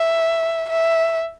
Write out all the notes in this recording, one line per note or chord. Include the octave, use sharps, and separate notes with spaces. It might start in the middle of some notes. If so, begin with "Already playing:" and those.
Already playing: E5
E5